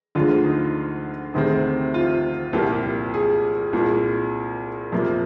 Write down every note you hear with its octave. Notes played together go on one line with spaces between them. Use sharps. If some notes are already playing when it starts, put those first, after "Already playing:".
D2 D3 F3 G#3 F4
D#4
D2 C3 D#3 G#3 C4 D#4
F4
C2 A#2 F3 A#3 G4
G4
G#4
C2 A#2 G#3
F2 C3 F3 A#3